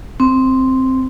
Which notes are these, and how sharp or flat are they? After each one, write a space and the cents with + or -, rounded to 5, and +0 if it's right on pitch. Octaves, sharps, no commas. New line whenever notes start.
C4 +0